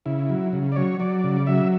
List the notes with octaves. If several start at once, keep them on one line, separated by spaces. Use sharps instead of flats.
C#3 E4
F#3
C#3
D5
F#3 C#5
F#3 D5
C#3
F#3 E5